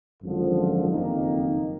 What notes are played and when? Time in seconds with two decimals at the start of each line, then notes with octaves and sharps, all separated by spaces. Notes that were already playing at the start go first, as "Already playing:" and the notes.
0.22 G#1 F#2 D3 F3
0.90 F#1 F2 D#3 A#3 D#4